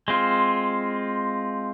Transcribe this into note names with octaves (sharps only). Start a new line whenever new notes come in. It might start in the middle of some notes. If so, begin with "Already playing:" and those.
G#3 C4 F4